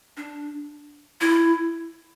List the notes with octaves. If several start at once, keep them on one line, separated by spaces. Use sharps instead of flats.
D4
E4